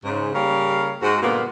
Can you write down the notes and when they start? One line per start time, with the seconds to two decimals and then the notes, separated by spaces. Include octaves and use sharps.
0.05 G#2 C#3
0.34 C#3 G3 A#3 C#5 F5
1.02 G#2 F#4
1.22 G2 A#2 D3 A#3 B3 F4